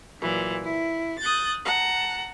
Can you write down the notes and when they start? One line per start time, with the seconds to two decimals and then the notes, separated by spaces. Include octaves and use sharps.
0.20 A#2 E3 F#3
0.64 E4
1.20 D#6 F#6 G6 A6
1.65 F#5 A5 A#5